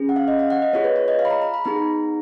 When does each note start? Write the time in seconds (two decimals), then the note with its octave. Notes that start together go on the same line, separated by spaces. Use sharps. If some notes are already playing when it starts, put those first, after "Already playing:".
Already playing: C#4 G#4
0.09 F#5
0.16 F5
0.28 D#5
0.39 F5
0.50 F#5
0.62 D#5
0.73 B3 F4 G#4 C#5
0.84 B4
0.96 C#5
1.08 D#5
1.19 F5
1.25 B5
1.30 A#5
1.42 A#5
1.54 B5
1.65 B3 D#4 G#4 A#5